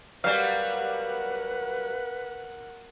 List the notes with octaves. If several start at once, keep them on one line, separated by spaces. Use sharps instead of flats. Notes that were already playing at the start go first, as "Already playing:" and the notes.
F#3 G3 A#4 B4 F5 F#5